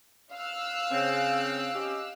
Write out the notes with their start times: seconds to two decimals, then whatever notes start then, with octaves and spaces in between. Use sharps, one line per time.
0.33 F5 E6 F#6
0.91 C#3 C4
1.75 C#4 D#4 G4